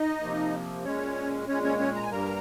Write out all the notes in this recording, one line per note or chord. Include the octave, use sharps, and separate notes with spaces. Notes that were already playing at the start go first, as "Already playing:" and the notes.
Already playing: D#4 D#5
C3 F3 A#3
A#2 G#3 C#4 C#5
A#2 G#3 C#4 C#5
C#4 C#5
C#4 C#5
A#5
G#5
G2 G3 A#3 A#4 A#5